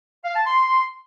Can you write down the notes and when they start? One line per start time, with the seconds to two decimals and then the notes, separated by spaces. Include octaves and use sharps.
0.24 F5
0.35 A5
0.45 C6